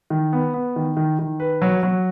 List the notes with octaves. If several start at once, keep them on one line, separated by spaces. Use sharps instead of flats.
D#3
B3
B3
D#3
D#3
D#3
B4
F#3
F#3